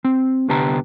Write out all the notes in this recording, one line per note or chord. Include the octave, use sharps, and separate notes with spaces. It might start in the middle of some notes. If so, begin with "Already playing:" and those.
C4
C2 D3 B3 G4 A5 A#5